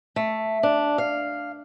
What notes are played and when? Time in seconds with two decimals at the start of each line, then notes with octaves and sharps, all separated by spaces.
0.16 A3
0.63 D4
0.98 F5